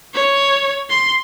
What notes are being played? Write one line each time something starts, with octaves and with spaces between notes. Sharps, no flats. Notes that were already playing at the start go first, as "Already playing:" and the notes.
C#5
C6